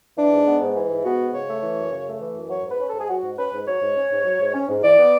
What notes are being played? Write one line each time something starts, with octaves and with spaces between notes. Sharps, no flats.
E3 D4
G#2
B3
G#2
E3
G#2
B3 F#4
G#2
C#3 C#5
A3
E3
F#2
C#3
A3
E3
F#2
F#3 C#5
G#2
B4
C#4
G#2 A4
G#4
F#3 F#4
G#2
C#4 B4
G#2
F#3 C#5
G#2
C#4
G#2
F#3
G#2
C#4
G#2
E3 D5
B3